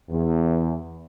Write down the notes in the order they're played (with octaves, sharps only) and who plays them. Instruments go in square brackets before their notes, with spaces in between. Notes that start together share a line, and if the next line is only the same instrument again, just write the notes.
[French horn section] E2